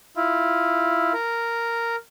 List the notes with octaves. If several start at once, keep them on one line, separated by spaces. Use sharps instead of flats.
E4 F4
A#4